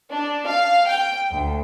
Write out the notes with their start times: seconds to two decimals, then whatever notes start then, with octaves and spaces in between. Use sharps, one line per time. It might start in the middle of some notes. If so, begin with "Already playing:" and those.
0.11 D4
0.47 F5
0.88 G5
1.31 D2